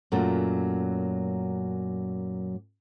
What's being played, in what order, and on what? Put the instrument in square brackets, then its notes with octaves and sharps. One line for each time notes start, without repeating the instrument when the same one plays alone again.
[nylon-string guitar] F#2 A#2 F#3 A3